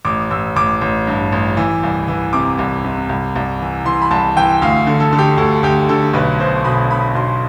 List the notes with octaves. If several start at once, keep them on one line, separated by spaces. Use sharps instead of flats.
A1 D6
A1 E6
A1 D6
A1
G2
A1
E3
C2
E3
C3 D6
C2
C3
C2
C2
E3
E3 C6
B5
C2 A5
E3 G5
D2 F5
D3
A4
D3
G4
D2 A4
D2 G4
D3 A4
B1 B4
B2 C5
B2 B5
B2 B5
B1 C6